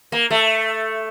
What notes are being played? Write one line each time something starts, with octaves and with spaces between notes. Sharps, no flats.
A#3
A3